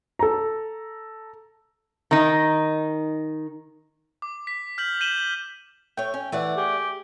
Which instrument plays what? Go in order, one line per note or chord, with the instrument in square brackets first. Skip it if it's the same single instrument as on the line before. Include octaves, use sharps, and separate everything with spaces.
[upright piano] A4 A#5
[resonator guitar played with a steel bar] D#3 D#4
[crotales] D6
B6
F6 G6 B6 F#7
G6 B6 D#7 E7 F#7 G7
[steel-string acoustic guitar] A3 C#5 [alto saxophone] G5
[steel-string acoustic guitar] C#4
[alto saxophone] E3 [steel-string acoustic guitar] A3 D5 F#5
[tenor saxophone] G4 [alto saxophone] G#4